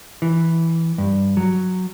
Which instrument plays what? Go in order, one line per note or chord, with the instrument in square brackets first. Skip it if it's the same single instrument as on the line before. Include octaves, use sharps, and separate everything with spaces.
[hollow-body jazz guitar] E3
G2
F#3